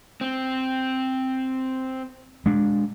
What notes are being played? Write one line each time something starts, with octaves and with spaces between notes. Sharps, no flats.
C4
G#3 D4